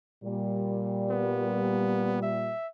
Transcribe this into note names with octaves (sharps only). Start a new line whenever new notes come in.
A#2 G3
B3
E5